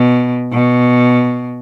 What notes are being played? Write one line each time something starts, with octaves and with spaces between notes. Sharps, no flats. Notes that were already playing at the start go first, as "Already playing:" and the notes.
Already playing: B2
B2